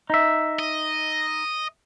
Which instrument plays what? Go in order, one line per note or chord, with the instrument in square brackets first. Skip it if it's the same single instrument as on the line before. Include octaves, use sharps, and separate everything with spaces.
[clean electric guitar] D#4 E5
[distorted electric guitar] D#5